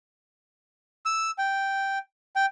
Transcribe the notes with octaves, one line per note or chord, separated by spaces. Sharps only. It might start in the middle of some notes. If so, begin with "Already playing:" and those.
E6
G5
G5